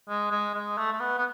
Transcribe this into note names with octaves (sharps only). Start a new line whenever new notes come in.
G#3
G#3
G#3
A3
A3
B3
B3